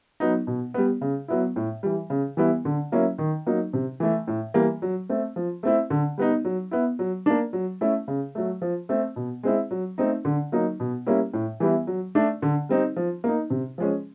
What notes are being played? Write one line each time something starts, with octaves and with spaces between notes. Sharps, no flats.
F#3 B3 D#4
B2
G3 B3
C#3
F#3 B3 E4
A2
E3 G3
C#3
E3 G3 B3 E4
D3
F#3 A#3 C#4 E4
D#3
F#3 A#3 D#4
C3
E3 A3
A2
E3 G3 A#3
F#3
A3 C4
F3
A3 C4 E4
D3
G3 B3 D#4
F#3
B3 E4
F#3
A#3 D4
F#3
A3 C#4 E4
C#3
F#3 A3
F3
A3 C4
B2
G#3 C4 E4
F#3
A3 C4 D#4
D3
F#3 A#3 D#4
B2
G3 A#3 C#4 E4
A2
E3 G3 B3 E4
F#3
A3 D4
D3
G3 C4 D#4
F3
A#3 D#4
C3
F3 G#3 C#4